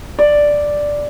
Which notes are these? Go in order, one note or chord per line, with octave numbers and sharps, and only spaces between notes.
D5